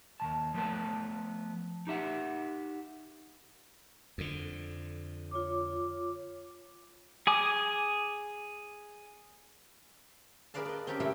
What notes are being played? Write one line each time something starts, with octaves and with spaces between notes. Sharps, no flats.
D#2 D#3 A5
F3 A3 B3 B4 A5
D#4 G4 E5 F#5
F2 D3
F4 C#5 D6
G#4 G#5 D6 D#6
G#4 A#4 B4 D5 F5 A5
D5 D#5
C4 C#4 G4 A#4 A5
C3 A3 E4 D#5 F5 G5